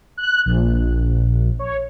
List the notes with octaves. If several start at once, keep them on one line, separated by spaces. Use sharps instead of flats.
F#6
A#1
C#5